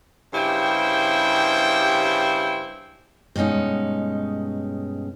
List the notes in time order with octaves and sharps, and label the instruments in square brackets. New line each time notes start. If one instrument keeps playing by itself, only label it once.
[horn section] G2 C#3 E4 G4 C5 G5
[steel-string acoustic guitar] G2 B2 G#3 C#4 D#4